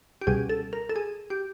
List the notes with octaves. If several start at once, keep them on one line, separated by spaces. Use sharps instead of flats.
G4
C#2 B2 G3 G#4
A4
A#4
A4
G#4
G4